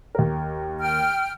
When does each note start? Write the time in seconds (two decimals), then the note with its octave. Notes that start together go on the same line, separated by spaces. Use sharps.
0.15 D#2 A#4
0.79 G5 F6